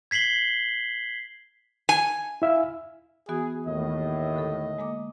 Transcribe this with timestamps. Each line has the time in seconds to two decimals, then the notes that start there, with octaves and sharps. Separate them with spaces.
0.11 G#6 B6 C7 F#7 G7
1.89 G#5
2.42 E4 E5 F5
3.29 E3 B3 F#4 G#4
3.67 D#2 A2 D#5
4.36 D3 G#3 A4
4.79 G#3 A#3 D6